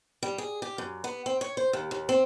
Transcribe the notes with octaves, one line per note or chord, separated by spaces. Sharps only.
G3
G#4
G4
F#2
B3
C4
C#5
C5
D#2
D#2
C4